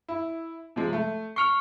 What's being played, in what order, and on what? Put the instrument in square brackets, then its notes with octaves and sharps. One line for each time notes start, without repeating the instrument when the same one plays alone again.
[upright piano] E4
C3 F3 G#3
A3
[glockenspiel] C#6 F6 [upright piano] C7 C#7 F7